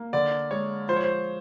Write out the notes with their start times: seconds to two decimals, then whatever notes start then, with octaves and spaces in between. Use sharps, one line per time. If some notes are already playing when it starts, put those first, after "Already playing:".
Already playing: A#3
0.13 D3 D5
0.51 G#3 C#5
0.89 F3 C5
0.96 C#5
1.04 C5